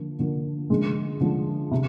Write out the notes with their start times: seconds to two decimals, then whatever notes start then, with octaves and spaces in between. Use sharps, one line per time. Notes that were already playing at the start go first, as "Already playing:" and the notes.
Already playing: D3 F3 A#3
0.19 D3 F3 A#3
0.70 D3 F3 G#3
1.21 D3 F3 G#3
1.71 C3